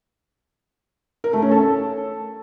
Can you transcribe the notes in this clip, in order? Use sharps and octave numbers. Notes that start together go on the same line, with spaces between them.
A#4
A3
C#4
A4